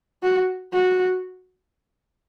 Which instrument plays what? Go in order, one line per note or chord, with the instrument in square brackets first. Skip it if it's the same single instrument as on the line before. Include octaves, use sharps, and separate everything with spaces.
[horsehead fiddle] F#4
F#4